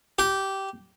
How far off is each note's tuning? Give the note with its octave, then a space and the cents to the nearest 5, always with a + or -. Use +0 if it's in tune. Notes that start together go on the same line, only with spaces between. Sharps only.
G4 -15